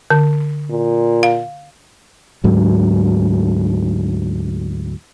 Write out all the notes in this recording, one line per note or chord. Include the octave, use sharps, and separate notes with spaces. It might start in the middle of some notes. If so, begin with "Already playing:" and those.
D3
A#2
F5
D2 G#2 F#3 A3